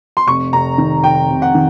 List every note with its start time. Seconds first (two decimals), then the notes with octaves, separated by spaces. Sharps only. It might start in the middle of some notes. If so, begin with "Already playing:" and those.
0.17 C6
0.27 F1 C#6
0.53 F1 A#5
0.78 D#3
1.04 F1 G5
1.29 F1
1.42 F#5
1.55 D#3